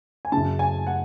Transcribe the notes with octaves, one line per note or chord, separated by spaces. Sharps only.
G#5
F#2 C#3 A5
G#5
F#5